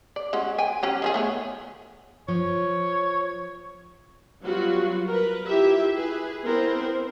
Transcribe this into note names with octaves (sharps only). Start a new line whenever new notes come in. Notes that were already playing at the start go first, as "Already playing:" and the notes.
D5
G#3 C#4 F#4
G5 G#5
F#3 C#4 G4
D#3 F3 G#4
A3 B3 C#5
F3 C#5
F#3 G3 B3 F4 F#4
A#4 B4
E4 F4 G4 E5
G#4 B4
B3 C4 E4 A#4 C5